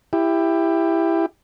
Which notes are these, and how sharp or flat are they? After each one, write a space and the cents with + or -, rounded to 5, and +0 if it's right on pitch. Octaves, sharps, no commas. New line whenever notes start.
E4 +10 G4 +15